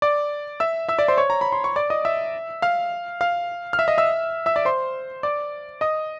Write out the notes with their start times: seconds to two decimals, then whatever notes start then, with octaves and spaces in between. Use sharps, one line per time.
0.02 D5 D6
0.60 E5 E6
0.88 E5 E6
0.98 D5 D6
1.08 C5 C6
1.18 C#5 C#6
1.30 A#5
1.41 B5
1.52 C6
1.64 C#6
1.76 D5 D6
1.90 D#5 D#6
2.05 E5 E6
2.62 F5 F6
3.21 F5 F6
3.73 F6
3.79 E5 E6
3.88 D#5 D#6
3.98 E5 E6
4.46 E5 E6
4.56 D5 D6
4.65 C5 C6
5.23 D5 D6
5.81 D#5 D#6